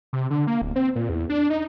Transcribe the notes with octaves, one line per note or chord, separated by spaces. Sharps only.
C3
D3
A#3
D1
C4
A#2
E2
D4
D#4